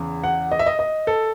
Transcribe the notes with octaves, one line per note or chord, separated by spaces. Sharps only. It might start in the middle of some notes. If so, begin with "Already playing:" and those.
Already playing: E2 C#3
F#5
D#5
E5
D#5
D#5
A4